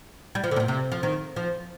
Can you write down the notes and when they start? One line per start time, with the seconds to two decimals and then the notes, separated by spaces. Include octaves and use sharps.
0.35 G3
0.44 F3
0.51 D3
0.56 C3
0.60 A#2
0.68 C3
0.92 F3
1.03 D#3
1.36 F3